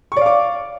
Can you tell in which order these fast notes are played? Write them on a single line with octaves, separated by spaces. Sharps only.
C#6 D5 F5 D6